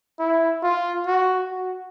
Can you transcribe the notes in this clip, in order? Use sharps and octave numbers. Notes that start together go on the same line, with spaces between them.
E4
F4
F#4
F#4